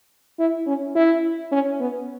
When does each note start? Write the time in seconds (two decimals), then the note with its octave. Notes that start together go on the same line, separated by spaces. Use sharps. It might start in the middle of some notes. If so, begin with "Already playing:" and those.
0.39 E4
0.67 C#4
0.95 E4
1.52 C#4
1.80 B3